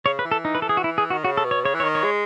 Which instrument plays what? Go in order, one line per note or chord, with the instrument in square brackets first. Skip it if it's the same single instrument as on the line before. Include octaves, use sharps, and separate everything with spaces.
[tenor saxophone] C#3 [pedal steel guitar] C#5
[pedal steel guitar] B4
[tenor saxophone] E3
[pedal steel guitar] A4
D#4
B4
A4
G#4
F#4
E4
G#4
F#4
[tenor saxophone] D#3
[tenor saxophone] C#3 [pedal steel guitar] F#4
[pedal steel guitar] A4
[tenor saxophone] B2
[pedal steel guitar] C#5
[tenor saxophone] C#3 [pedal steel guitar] C#5
[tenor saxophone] E3
[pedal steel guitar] C#5
[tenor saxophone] D#3
[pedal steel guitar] C#5
[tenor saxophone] G#3